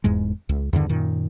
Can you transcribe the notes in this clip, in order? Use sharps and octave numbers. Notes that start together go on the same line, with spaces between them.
F1 E2 G#2 G#3
C#2
E2 G2 D3 D#3
F#2 A#2 D#3